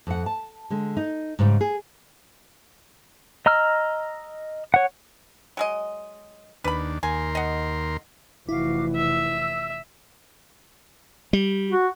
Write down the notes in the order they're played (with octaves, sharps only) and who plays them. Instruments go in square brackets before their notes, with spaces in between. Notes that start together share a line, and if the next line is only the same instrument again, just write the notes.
[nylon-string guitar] F2 F#5
A5
D3 G#3
D#4
G#2 C#3 G3 D#4
G#4
[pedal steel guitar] D#5 A#5 E6 F6
C#5 F#5
[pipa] F#3 G#3 D#5
[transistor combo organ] D#2 D4 [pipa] B4 B5
[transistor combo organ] D#2 A#4 C6 [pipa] G#5
[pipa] D#5 F#5
[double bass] F1 E3 [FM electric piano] E4 [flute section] F#4 F5 D6
[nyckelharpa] E5 [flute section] E6
[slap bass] G3
[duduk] F#4